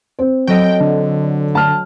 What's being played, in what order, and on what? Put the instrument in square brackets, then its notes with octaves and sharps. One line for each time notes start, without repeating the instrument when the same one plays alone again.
[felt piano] C4 C5
[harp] F#3 A4 D#5 [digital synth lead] G5
[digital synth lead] D3
[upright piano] A5 F6